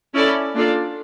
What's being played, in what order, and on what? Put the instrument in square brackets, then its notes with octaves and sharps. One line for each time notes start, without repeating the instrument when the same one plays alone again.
[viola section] C#4 E4 A4 D5
A#3 D4 F4 A4 D5